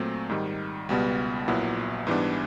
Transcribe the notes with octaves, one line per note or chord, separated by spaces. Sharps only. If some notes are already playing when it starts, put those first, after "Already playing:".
Already playing: A#2 F#3 A3 C4
G#2 D#3 G3
C#2 B2 G3 B3
A#1 A#2 F#3 B3 E4
G#2 E3 G3 B3 D4